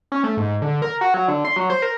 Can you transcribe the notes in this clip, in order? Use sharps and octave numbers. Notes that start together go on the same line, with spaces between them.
C#4
A3
G#2
D3
A#4
F#4
F#3
D3
C6
F#3
C5
A#4